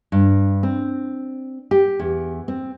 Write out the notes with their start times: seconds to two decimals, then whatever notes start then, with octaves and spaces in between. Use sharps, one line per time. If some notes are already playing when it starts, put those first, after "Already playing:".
0.12 G2
0.63 C4
1.71 G4
1.99 E2
2.48 C4